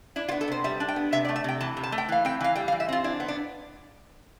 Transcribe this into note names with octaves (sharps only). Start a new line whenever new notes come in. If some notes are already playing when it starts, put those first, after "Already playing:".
D4 E4
F4
B3
A4
C3 C5
G3 E5
D4
G5
B3
C3 E5
D5
A3
E5
C3 G5
E3 A5
C3
A5
A3
G5
E3 F5
C4 G5
E3 F5
G3 G5
F5
E3
E5
C4 F4
D4 E4
B3
D4